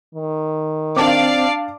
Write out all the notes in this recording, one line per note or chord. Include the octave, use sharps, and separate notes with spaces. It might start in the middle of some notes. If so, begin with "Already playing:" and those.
D#3
C4 D4 D5 F5 A5 D6